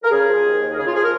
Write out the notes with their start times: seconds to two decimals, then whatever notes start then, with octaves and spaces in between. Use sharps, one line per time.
0.03 A#4
0.10 C#3 G#4
0.27 F3
0.44 D#2
0.60 D#2
0.72 A#4
0.77 C#3 G#4
0.86 F4
0.94 F3 G#4
1.03 A#4